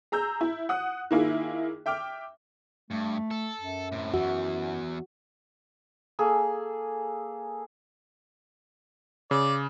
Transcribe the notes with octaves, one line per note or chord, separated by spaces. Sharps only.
G#4 A#5 E6 G6
E4
F#5 D#6 F#6
D#3 A#3 E4 F4 G#4
E5 G5 D6 F6
G2 A3
A4
F#2
A2 C3
E2 E3 F#4
A#3 G#4 A4
C#3 D5